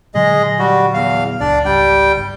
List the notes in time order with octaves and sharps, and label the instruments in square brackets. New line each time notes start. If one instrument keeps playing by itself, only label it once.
[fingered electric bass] A#2 D3 F#3 [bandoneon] G#3 G#4 D#5
[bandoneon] G3 F#4
E2 F5
[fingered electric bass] F#1 C#2 [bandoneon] D4 D5
[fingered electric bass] G#1 C#2 [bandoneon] G3 G5
[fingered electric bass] G1